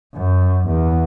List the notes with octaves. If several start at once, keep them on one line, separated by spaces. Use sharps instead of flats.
F#2
E2